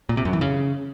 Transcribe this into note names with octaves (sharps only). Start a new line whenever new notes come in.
A#2
C3
F#2
E3
C#3